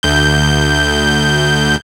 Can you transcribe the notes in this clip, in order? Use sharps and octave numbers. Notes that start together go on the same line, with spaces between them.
D2 G6